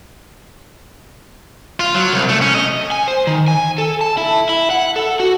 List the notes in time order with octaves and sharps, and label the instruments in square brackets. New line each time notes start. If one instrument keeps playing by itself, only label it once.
[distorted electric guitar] F4
F#3
C2
A3
C#4
D#5
[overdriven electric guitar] G#5
C5
D#3
G#5
A4
A5
E4
E4
F#5
A4
F#4